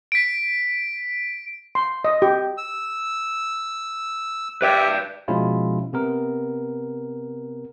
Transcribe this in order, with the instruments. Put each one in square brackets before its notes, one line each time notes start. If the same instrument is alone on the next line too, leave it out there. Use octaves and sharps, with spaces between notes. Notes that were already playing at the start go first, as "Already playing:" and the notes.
[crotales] B6 D7
[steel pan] C6
D#5
G4
[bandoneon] E6
[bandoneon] G4 E5 [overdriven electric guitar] B4 D5
[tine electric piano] B2 F3 G#3 C#4 E4 F4
C3 B3 A#4